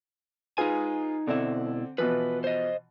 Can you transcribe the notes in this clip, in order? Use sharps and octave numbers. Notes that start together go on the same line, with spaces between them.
D#4 F4 G#4 B4 G#5
B2 D3 C4 E4 D5
B2 E3 F3 B4
C5 D#5